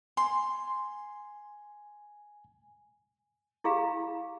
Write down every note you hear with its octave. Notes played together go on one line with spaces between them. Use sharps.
G#5 C6
E4 G4 G#4 F5 B5